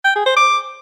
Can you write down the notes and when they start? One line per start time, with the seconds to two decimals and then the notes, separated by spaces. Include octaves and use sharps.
0.05 G5
0.15 G#4
0.26 C5
0.36 D6